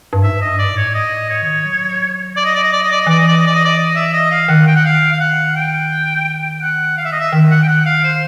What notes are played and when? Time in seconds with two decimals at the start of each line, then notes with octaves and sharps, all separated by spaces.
0.13 G2
0.23 G#2 E5
0.41 D#5
0.47 G2
0.59 D5
0.71 A2
0.77 C#5
0.95 G#2 D#5
1.18 A2
1.30 C#5
1.42 D#3
1.65 F#3
2.37 D5
2.45 D#5
2.55 D5
2.64 D#5
2.73 D5
2.83 D#5
2.92 D5
3.01 D#5
3.07 E3 D5
3.19 D#5
3.28 D5
3.38 D#5
3.47 D5
3.56 D#5
3.65 D5
3.78 D#5
3.96 E5
4.13 D#5
4.31 F5
4.48 D#3 F#5
4.67 G5
4.76 F#5
4.85 F5
5.12 F5
5.20 F#5
5.56 G5
6.61 F#5
6.97 F5
7.05 E5
7.12 D#5
7.20 E5
7.32 D#3
7.51 F#5
7.63 G5
7.68 F#5
7.86 F5
8.04 C5